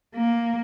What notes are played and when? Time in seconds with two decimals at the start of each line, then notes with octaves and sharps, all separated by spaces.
0.16 A#3